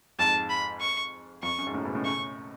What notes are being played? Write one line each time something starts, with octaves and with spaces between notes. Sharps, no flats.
F2 G#2 A5
B5
C#6
F2 C#6
F#2
G#2
F#2 A2
G#2 B2
A2 C#3
A2 C#3 C#6